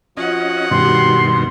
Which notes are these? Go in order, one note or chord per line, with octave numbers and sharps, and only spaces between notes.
F3 C#4 F4 F#4 D#5 F#5
G2 B2 D#3 F#4 G4 C6